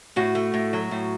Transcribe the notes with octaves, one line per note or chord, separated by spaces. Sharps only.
A2 F#4
A3
A2
F#3
A2